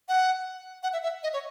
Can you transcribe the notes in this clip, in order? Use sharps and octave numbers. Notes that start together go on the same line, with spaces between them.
F#5
F#5
E5
E5
D#5
C#5